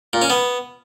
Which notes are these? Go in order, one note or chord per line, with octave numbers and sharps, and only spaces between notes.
A#2
C#4
B3